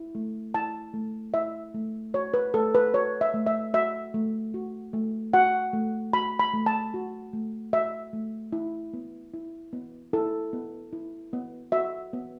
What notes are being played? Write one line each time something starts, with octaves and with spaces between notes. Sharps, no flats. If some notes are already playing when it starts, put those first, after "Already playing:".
Already playing: E4
A3
E4 A5
A3
E4 E5
A3
F#4 C#5
B4
A3 A4
B4
F#4 C#5
E5
A3
E5
F#4 E5
A3
F#4
A3
F#4 F#5
A3
F#4 B5
B5
A3
A5
F#4
A3
F#4 E5
A3
E4
B3
E4
B3
E4 A4
B3
E4
B3
F#4 E5
B3